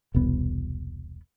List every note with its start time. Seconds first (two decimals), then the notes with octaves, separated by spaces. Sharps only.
0.14 E1 C2 B3